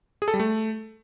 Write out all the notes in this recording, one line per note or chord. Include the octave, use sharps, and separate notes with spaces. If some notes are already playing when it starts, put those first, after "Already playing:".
G#4
A4
G3
A3